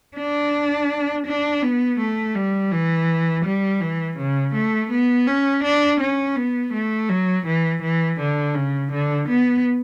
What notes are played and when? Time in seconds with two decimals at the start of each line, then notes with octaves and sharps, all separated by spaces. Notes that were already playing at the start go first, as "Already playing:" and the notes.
0.17 D4
1.26 D4
1.62 B3
1.99 A3
2.35 G3
2.72 E3
3.45 G3
3.81 E3
4.17 C#3
4.54 A3
4.90 B3
5.27 C#4
5.63 D4
6.00 C#4
6.36 B3
6.73 A3
7.09 F#3
7.46 E3
7.82 E3
8.19 D3
8.55 C#3
8.91 D3
9.28 B3